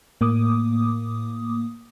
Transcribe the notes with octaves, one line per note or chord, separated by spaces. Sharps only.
A2 A#3 D6 D#6